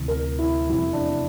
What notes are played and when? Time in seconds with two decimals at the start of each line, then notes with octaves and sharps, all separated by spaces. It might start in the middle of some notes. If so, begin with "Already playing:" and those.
Already playing: D2 C3 E3
0.08 A#4
0.39 E4
0.70 F1 E2 C3 G3 E4
0.93 D4